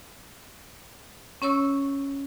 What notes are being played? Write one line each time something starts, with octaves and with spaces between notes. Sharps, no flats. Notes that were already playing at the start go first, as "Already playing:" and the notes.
C#4 C#5 C#6 E6